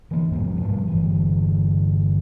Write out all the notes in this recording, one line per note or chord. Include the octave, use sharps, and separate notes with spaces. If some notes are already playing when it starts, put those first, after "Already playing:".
E3 A#3
E2 G#2 F3
G#2 F3 G3 A3
G1 E3